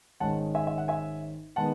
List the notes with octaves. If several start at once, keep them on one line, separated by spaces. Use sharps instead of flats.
G#1 G#2 D#3 G#3 C#4 F#5 A5
E5 G#5
E5
F#5
E5 G#5
D#3 G#3 B3 F#5 A5